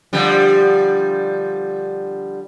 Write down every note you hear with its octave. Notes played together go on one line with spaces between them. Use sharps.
D3 F3 G3